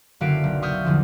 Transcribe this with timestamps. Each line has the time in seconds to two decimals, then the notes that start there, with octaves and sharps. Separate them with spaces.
0.21 F#1 D3 F#4 E5 F5 D7
0.44 B1
0.62 E5 C#6 D#6 F6 G6
0.85 E2 D3 F3